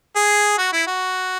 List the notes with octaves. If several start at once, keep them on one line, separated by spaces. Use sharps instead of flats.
G#4
F#4
E4
F#4